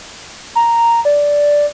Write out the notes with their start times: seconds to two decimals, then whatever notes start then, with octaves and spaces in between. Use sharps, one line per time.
0.55 A#5
1.05 D5